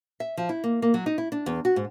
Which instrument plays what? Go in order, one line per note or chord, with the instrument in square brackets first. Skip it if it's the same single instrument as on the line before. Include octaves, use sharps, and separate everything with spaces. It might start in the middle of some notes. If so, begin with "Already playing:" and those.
[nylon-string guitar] E5
F3
E4
A#3
A#3
F#3
D#4
E4
D4
E2
F#4
G#2